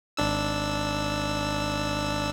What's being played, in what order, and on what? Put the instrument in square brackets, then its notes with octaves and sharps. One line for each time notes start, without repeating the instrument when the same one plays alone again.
[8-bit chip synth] G#1 D4 E6